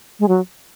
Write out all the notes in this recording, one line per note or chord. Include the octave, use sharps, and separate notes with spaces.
G#3
F#3